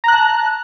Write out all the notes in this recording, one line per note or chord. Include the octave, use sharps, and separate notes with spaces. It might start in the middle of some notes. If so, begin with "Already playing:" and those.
A5 A#5 F#6